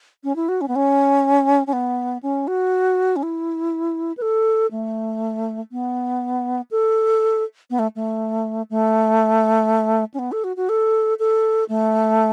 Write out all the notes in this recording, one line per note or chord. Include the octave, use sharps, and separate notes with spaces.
C#4
E4
F#4
C#4
B3
C#4
C#4
B3
C#4
F#4
C#4
E4
B4
A4
A3
B3
A4
B3
A3
A3
A3
C#4
B3
A4
F#4
F#4
A4
A4
A3